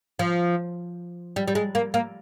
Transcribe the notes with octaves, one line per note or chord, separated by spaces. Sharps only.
F3
G3
G3
G#3
A#3
A#3